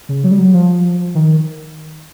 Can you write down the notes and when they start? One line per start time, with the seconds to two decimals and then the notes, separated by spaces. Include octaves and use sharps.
0.09 C#3
0.24 F#3
0.31 G3
0.39 F#3
0.53 F3
1.15 D#3